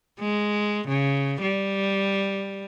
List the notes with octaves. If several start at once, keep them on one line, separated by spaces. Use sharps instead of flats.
G#3
C#3
G3